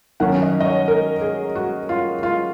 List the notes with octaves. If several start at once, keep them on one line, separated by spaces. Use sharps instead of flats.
D#3 F#3 C#4 F#5
D#5
D#5
C#5
A#4
G#4
F#4
F4
F4